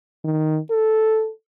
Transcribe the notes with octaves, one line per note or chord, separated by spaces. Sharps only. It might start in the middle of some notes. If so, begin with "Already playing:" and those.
D#3
A4